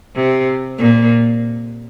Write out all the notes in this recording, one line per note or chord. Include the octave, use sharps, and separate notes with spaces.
C3
A#2